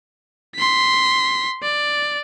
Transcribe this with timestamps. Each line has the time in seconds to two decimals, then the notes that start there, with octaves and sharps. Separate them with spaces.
0.56 C6 B6
1.63 D5